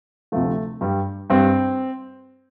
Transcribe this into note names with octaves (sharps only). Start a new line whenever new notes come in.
D2 C3 F3 A3
G2 G3
G2 G3 C4